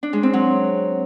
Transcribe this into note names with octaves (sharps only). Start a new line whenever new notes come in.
D4
G#3
C4
F#3